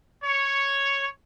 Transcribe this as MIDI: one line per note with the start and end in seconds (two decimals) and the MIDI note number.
0.23 1.06 73